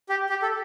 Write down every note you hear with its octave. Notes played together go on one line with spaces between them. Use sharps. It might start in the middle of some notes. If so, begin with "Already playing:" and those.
G4
G4
A4